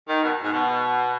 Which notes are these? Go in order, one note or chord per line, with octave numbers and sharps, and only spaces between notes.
D#3
B2
G#2
B2